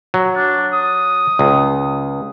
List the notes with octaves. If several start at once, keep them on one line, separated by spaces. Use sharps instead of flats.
F#3
D4
D#6
C#2